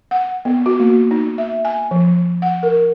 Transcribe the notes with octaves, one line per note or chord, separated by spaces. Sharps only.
F#5
B3
F#4
A#3
D#4
E5
G#5
F3
F#5
A#4